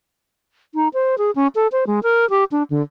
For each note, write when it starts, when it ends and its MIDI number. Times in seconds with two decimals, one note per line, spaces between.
0.75 0.88 63
0.94 1.15 72
1.18 1.31 68
1.36 1.47 61
1.55 1.67 69
1.72 1.84 72
1.87 2.00 56
2.03 2.29 70
2.30 2.44 67
2.52 2.63 62
2.70 2.81 50